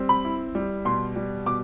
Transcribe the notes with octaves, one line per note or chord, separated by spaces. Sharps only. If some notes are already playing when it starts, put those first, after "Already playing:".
Already playing: G3 C4
B5
E4
G3
B2 C6
G3
B2 D6